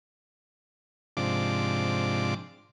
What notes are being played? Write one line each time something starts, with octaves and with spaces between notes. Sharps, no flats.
G#2 C3 F3 D4 D6